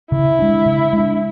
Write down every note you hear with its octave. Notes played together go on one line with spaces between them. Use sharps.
C#3 E4
G#3 D4
C#3
G#3 D4